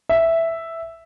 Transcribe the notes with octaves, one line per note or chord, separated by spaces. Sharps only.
E5